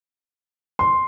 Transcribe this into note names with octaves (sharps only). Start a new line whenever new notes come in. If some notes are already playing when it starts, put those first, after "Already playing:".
C6